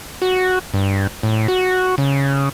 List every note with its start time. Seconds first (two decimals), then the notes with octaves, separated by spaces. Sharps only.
0.22 F#4
0.74 G2
1.23 A2
1.48 F#4
1.98 C#3